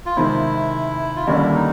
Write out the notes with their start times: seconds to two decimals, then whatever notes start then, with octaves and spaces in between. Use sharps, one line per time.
0.06 F4
0.16 C3 D#3 G#3 C4 E4
1.16 F4
1.27 D#2 D3 G3 A#3 C#4 E4
1.54 D#4